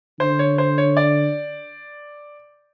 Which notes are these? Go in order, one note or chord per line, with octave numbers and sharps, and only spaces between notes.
D3 C5
C#5
C5
C#5
D5